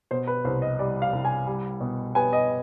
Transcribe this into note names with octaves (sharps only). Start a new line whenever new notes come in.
B2 C5
B4
C2 C5
D#5
G3 D5
F5
C2
G#5
G3
B2
B3 G#5
D#5